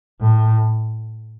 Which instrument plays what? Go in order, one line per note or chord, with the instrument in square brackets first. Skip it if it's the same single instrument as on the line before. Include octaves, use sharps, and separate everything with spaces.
[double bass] A2